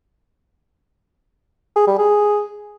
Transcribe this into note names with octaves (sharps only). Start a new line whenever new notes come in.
G#4
G3
G#4